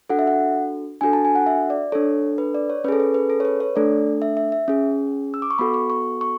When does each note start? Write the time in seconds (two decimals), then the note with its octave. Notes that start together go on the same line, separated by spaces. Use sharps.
0.09 D4 F#4 A4 F#5
0.19 E5
0.27 F#5
1.01 D4 F#4 A4 G#5
1.13 A5
1.25 G#5
1.35 F#5
1.47 E5
1.70 D5
1.92 D4 A4 C#5
2.38 B4
2.55 D5
2.70 C#5
2.84 C#4 B4
2.88 G#4 A4
3.00 B4
3.14 B4
3.30 A4
3.40 C#5
3.45 B4
3.60 C#5
3.76 A3 D4 A4 D5
4.22 E5
4.37 E5
4.52 E5
4.68 C#4 G#4
5.34 E6
5.42 D6
5.51 C#6
5.59 B3 F#4 A4 B5
5.74 C#6
5.90 C#6
6.21 C#6